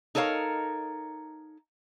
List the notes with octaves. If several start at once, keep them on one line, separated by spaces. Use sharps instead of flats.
D#4 A4 A#4 C#5 F5